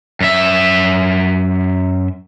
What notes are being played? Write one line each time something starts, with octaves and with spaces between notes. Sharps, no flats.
F#2 E5